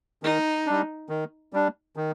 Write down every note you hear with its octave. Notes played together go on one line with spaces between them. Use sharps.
D#3 D#4
G3 D4
D#3
G3 D4
D#3